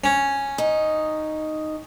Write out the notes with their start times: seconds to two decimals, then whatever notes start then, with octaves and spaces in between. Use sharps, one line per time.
0.04 C#4
0.58 D#4